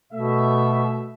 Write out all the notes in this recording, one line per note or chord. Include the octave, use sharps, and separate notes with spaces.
B2 A3 E5